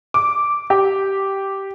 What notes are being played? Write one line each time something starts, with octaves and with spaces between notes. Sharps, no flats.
D6
G4